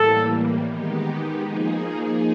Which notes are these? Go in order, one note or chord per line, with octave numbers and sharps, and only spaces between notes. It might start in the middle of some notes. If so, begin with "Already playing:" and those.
Already playing: A2 E3 G3 A#3 A4
D#3 G#3 B3 D#4 G4
F3 A#3 D#4 G#4